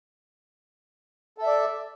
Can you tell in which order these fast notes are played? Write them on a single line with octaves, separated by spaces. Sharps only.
A4 E5 D5